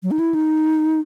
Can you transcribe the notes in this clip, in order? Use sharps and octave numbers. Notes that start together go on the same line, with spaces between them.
F#3
D#4
E4
D#4